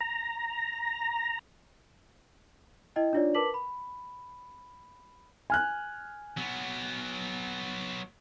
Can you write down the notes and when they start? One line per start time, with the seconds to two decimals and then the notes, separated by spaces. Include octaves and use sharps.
0.01 A#5
2.96 E4 D#5 G5
3.13 D4 D#4 F4 C#5 D5
3.34 A#4 B4 A5 D6 B6 F#7
3.54 B5
5.50 G#5 F6 F#6
6.37 F#3 B3